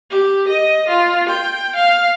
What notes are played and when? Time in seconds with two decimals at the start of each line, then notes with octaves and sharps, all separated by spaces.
0.10 G4
0.48 D#5
0.88 F4
1.29 G5
1.76 F5